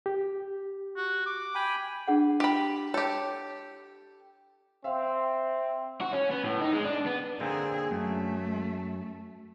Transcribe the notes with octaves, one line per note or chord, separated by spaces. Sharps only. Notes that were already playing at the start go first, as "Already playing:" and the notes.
G4
F#4
D6
G5 G#5 B5
D4 G#4 F#5
G4 B5
G4 A4 C#5
C4 E5 F5
F#4
C#4
B3
A2
D#4
G#3
D4
B3
D3 A#3 C4 G#4
F#2 A3